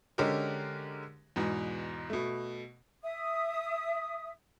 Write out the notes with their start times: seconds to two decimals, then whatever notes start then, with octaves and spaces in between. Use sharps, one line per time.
0.18 D3 G#3 C#4 D4 G4 A#4
1.36 E2 G#2 B2
2.10 B2 A3
3.02 E5 D#6